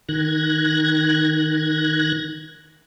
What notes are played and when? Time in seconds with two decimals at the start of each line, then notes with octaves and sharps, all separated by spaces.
0.09 D#3 F#6 G#6 A#6